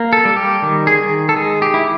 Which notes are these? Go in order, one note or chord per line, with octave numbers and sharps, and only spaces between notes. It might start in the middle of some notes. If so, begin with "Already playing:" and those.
Already playing: A#3
A4
G3
G4
D#3
G#4
D#3
A4
G#3 G#4
G4
E4